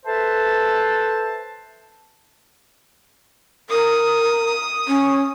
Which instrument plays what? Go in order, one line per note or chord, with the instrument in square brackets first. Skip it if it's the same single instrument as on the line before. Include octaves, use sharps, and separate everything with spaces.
[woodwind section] A4 B4 C5 E5 A5
[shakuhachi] A#4 [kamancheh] D#6
[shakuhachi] C#4